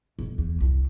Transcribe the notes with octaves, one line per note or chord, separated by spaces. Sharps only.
D#1
E2
C2